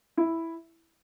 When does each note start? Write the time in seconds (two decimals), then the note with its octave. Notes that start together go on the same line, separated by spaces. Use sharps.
0.17 E4